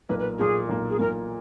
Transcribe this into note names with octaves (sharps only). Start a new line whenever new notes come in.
B1 A#2 A#3 B4
B4
B1 A#2 A#3 G#4
B1 A#2 A#3
G#4
B1 A#2 A#3 A#4